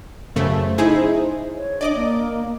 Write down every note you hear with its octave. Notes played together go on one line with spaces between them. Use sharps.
F#2 C#3 A3 C5
D#4 E4 G#4
C#5
D4 D5 D#5 D6
A#3